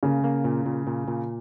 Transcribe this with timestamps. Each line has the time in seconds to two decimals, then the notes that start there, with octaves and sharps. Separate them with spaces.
0.03 C#3 A#3
0.24 A#3
0.44 A#2
0.66 A#2
0.87 A#2
1.08 A#2